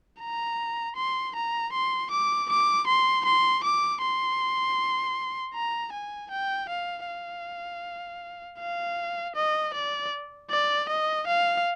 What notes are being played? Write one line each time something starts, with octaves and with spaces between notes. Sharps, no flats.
A#5
C6
A#5
C6
D6
D6
C6
C6
D6
C6
A#5
G#5
G5
F5
F5
F5
D#5
D5
D5
D#5
F5